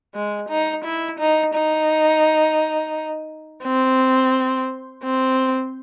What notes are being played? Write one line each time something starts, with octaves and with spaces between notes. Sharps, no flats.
G#3
D#4
E4
D#4
D#4
C4
C4